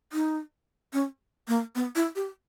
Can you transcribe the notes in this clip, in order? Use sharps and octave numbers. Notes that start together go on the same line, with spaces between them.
D#4
C#4
A#3
B3
E4
G4